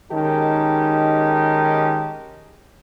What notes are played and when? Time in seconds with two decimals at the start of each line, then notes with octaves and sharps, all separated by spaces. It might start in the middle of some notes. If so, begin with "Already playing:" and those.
0.12 D#3 G#3 C#4 D#4 G4 A5